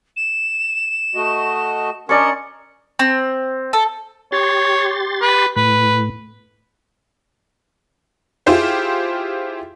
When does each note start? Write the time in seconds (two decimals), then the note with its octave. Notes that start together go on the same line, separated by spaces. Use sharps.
0.16 E7
1.15 A3 F#4 D#5
2.09 C#4 D4 A#4 D5 D#5 C#7
2.99 C4
3.73 A4
4.32 G4 C#5 C6 A6
5.22 B4
5.56 A2 B4
8.46 E4 F4 G4 G#4 C5 F5